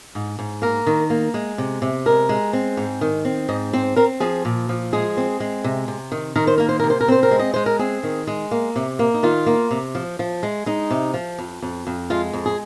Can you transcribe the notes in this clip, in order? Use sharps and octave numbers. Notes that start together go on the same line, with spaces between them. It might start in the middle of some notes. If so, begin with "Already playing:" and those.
G#2
G#2
A#3 A#4
D#3
A#3
G#3
C3
C3
G#3 A#4
G#3
C4
G#2
D#3
C4
G#2 D#5
C4 C5
C4 A#4
F3 G#4
A#2
F3
G#3 G#4
C4
G#3
C3
C3
D#3
D#3 A#4
C5
A#3 A#4
C5
C3 A#4
C5
A#4
C4 C5
A#4
G#3
D#5
G#3 C5
A#4
C4 G#4
D#3
G#3
A#3
C3
A#3
D#4
D#3 F4
A#3
C3
F3
F3
G#3
G#3 D#4
C3
F3
F2
F2
F2
G#3 F4
F2
G#4